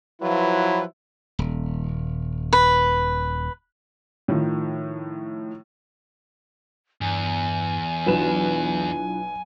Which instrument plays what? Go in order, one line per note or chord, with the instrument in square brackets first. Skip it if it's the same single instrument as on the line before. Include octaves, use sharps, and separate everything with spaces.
[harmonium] F3 F4 B4 [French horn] F#3 [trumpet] E4
[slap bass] D#1
[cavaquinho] B4
[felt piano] A2 D#3 F3
[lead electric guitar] E2 [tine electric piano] G2 [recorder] G#5
[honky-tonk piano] B1 B4 E7 [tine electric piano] D4 E4 F4